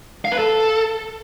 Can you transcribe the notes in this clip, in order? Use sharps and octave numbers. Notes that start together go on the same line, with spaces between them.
F5
B4
A4